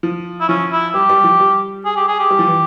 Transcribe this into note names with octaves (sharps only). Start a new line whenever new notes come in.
F3
E4
F3 C#4
E4
G3 G4
G3
F3
G3
G#4
G4
G#4
G4
G3
F3
E3